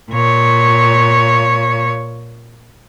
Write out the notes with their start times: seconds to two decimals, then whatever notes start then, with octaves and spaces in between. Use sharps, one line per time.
0.11 A#2 C#5